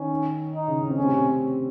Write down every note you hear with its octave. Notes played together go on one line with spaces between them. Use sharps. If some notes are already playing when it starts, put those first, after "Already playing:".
Already playing: D#3 C#4 D#4
D#4
C#3 C#4
C#4
C4
A3 C#4
C3 C4